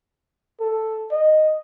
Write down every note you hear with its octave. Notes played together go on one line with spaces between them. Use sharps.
A4
D#5